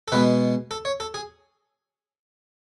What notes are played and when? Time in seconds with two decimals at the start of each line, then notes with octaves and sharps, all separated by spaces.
0.08 A4
0.12 B2 G#3 B3 B4
0.71 A4
0.85 C#5
1.00 A4
1.14 G#4